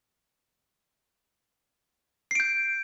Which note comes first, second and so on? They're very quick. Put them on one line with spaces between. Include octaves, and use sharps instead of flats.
C7 D7 G6